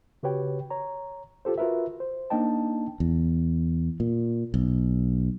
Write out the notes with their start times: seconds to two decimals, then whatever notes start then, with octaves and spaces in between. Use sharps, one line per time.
0.23 C#3 F#4 G4 B4 C#5 G5
0.70 C#5 A#5
1.45 F4 G4 A4 C5
1.58 F4 F#4 A#4 B4 E5
2.00 C5
2.30 A#3 D4 D#4 D#5 G5 A5
3.00 E2
4.00 A#2
4.54 B1